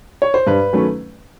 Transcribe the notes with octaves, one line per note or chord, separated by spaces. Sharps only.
C#5
C5
G2 B4
D#3 F#3 A3 C#4